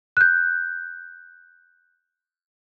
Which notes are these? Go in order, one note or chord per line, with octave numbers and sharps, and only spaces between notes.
F#6 G6